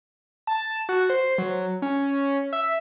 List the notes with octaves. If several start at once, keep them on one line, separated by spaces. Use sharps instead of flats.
A5
F#4
C5
F#3
C#4
E5